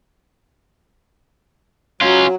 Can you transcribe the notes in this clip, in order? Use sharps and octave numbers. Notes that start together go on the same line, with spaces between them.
F#3 C#4 F4